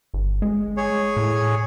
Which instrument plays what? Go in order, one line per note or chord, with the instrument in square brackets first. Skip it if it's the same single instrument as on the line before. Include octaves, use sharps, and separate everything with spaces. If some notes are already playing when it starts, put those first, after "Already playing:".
[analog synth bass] G1
G#3
[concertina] G#4 C#5
[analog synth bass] A2